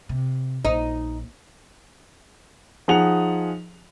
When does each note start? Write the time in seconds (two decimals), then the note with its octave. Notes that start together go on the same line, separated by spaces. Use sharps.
0.09 C3
0.65 A#1 D#4
2.88 F3 D#4 G#4 F#5 F7